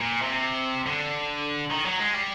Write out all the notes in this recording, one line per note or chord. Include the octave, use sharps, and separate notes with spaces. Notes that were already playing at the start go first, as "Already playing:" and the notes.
A#2
C3
D3
D#3
F#3
G#3
G3